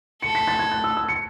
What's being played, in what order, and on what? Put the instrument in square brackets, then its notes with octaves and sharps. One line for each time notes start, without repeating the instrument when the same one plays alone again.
[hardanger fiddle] A4 [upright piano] C#7
[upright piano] B6
A6
G#6
F#6
E6
E6
C#7